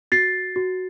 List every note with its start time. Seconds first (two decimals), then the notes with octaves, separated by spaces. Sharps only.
0.12 F#4 A6 C7
0.56 F#4